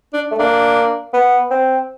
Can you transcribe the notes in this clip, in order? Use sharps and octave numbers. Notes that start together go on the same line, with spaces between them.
D4
A3
A#3 D4
B3
C4